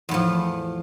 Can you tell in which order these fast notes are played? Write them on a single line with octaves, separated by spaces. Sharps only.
E2 A2 F3